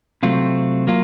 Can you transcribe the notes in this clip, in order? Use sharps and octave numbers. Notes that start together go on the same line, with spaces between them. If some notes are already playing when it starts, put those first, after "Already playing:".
C3 F#3 A3 C4 F4
F#3 A#3 F4